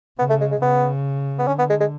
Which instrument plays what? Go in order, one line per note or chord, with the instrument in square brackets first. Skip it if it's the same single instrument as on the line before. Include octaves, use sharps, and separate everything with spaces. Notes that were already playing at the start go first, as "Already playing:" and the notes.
[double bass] C#3 [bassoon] B3
[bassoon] A3
G#3
G#3
[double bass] C#3 [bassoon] B3
[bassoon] B3
[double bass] D3 [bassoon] C#4
[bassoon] B3
G#3
G#3